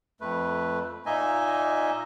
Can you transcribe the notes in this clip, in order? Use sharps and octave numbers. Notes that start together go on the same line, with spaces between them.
F2 A3 B4
A#2 A#3 D#4 D#5 E5 G#5